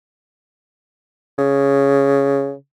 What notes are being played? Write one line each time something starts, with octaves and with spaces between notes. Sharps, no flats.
C#3